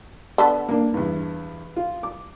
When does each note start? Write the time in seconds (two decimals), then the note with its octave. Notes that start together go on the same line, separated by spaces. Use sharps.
0.38 D3 B3 A4
0.69 A#3 D4
0.94 E2 G2
1.76 F4
2.03 D6